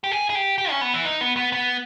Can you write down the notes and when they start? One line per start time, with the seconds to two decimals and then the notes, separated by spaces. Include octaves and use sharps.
0.04 G4
0.11 G#4
0.30 G#4
0.35 G4
0.58 G4
0.70 C#4
0.81 B3
0.94 E3
1.05 D#4
1.21 B3
1.37 B3
1.52 B3